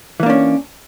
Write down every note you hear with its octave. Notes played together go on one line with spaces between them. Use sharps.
E3 A#3 C#4 D4